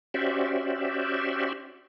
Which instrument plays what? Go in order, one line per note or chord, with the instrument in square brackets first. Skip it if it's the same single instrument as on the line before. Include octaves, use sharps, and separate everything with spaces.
[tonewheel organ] C#4 F#4 G4 C5 D5 E5